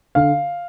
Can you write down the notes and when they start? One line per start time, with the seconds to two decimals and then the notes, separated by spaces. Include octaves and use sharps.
0.15 D3 F5